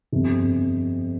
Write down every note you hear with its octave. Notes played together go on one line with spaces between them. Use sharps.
G1 F2 C3